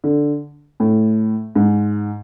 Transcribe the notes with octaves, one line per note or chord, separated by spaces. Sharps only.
D3
A2
G#2